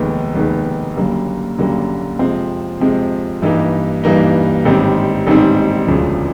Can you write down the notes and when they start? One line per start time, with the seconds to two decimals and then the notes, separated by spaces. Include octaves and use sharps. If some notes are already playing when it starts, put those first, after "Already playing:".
Already playing: F1 D#2 D#3 G#3 B3
0.35 F1 D#2 D#3 G#3 B3
0.97 F#1 F#2 D3 G3 A#3
1.58 F#1 F#2 D3 G3 A#3
2.19 F2 C3 F3 G#3 C4
2.80 F2 C3 F3 G#3 C4
3.42 G2 E3 G3 A#3 D#4
4.03 G2 E3 G3 A#3 D#4
4.65 A1 G#2 D#3 G3 C4
5.27 A1 G#2 D#3 G3 C4
5.88 E1 D2 C#3 F3